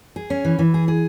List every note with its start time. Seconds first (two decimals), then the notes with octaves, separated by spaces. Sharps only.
0.16 G#4
0.30 C#4
0.45 E3
0.59 E3
0.74 G#4
0.88 G#4